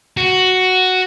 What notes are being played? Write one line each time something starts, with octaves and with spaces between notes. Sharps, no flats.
F#4